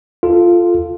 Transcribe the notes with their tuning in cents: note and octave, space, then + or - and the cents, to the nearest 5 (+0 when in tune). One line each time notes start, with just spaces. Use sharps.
F4 -5 A4 +0